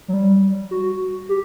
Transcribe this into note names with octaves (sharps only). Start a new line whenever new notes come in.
F#3
G3
F#4
G4